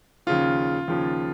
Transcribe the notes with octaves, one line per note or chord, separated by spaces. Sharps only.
D#2 C#3 F3 F4
D#2 C#3 F3